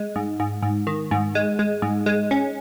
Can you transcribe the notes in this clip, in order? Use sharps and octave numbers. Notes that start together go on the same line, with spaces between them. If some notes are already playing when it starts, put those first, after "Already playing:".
Already playing: G#3
G#2
G#2
G#2
D#3
G#2
G#3
G#3
G#2
G#3
C#4